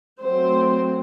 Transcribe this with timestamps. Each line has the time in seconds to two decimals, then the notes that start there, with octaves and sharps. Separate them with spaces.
0.22 F#3 A3 C4 C5